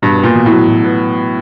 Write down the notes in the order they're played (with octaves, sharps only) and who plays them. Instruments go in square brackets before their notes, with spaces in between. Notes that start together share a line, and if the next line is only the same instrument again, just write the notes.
[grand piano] G2 [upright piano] B2
[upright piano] B3
[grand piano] A#2
[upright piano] B2
[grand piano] A2
[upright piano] F#3
B2
B3